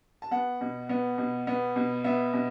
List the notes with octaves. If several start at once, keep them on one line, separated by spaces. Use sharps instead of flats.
A5
B3 F#5
B2
B3
B2
B3
B2
B3 E5
B2